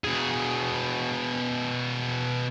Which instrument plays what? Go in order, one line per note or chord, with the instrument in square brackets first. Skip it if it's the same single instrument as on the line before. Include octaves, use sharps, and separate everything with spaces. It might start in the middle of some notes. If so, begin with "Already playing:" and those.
[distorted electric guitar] B2 G#4